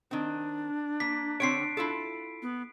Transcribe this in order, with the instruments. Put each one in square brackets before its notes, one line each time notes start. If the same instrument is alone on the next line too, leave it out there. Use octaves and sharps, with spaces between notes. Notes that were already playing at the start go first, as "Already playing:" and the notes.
[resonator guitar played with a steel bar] D#3 C4 [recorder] D4
[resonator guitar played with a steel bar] A#3 [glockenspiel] B6
[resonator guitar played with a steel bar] D3 C4 C#5 [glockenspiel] C7 D7
[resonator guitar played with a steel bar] E4 F4 A4
[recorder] B3